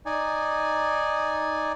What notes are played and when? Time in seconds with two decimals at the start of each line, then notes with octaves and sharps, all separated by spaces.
0.06 D#4 D5 G#5